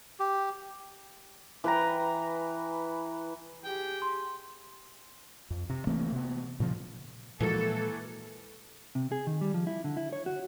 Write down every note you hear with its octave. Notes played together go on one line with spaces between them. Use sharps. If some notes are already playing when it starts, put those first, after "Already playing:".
G4
E3 B4 G5 A#5
G4 G#4 G5
C6
F2
C3
E3 A3 A#3 C4
C3 B3
A#2 C#3 F3
A#2 E3 F3 G#3 A#3 F#4 A4
C3
G#4
D#3
G3
F3
E4
D3
E4
C#5
F#4